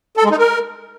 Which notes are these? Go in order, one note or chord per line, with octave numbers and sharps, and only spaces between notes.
A4
G#3
D#4
A#4